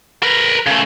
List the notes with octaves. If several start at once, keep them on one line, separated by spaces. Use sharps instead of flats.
A#4 B4
C#3 A3